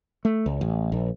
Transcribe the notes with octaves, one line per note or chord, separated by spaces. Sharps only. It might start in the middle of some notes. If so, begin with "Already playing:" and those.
A3
C#2
A1
A#1